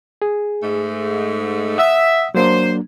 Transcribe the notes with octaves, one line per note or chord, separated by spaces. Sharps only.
G#4
G#2 A3
E5 F#5 D#6 E6
F#3 A#3 D4 C5